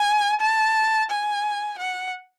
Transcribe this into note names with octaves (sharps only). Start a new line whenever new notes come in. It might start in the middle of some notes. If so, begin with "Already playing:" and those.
Already playing: G#5
A5
G#5
F#5